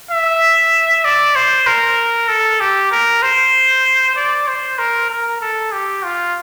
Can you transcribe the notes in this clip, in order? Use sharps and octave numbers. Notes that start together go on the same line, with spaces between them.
E5
D5
C5
A#4
A4
G4
A#4
C5
D5
C5
A#4
A#4
A4
G4
F4